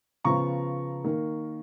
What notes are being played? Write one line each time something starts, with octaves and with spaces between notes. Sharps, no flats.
C#3 F3 B3 A#5 C#6
D#3 A#3